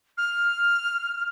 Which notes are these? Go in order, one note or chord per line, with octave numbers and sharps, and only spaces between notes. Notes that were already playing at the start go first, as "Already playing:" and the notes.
F6